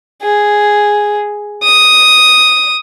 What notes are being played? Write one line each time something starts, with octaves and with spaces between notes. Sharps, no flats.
G#4
D#6